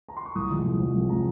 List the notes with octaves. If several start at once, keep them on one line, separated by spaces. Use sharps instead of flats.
A#5
C6
C#6
C2 D#6
C3 F3 G#3
C2
C3 F3 G#3
C2
C3 F3 G#3 A#5